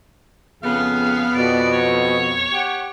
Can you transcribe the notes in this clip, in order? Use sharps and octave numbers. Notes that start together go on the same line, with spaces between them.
F2 C#3 B3 G#4 F5
F2 B2 D5
C#5
G4 F#5